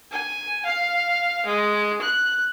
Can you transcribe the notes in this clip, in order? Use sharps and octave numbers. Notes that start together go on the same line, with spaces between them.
G#5
F5
G#3
F#6